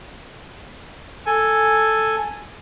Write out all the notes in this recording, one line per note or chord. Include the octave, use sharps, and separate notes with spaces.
A4 G#5